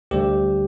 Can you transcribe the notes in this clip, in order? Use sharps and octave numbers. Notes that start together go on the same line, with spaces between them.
D2 D3 G3 G4